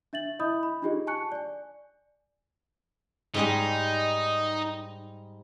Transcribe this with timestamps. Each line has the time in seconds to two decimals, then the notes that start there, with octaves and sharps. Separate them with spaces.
0.13 D4 E5 A6 F#7
0.39 E4 D#5 E5 B5 D#6 G6
0.63 B5
0.82 D4 D#4 F4 G4 G#4 D#5
1.07 G#5 A5 C#6 F#6 C#7
1.32 D5 G#5
3.34 G#2 G3 D#4 G#4